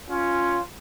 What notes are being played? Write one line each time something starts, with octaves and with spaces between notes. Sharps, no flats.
C#4 F4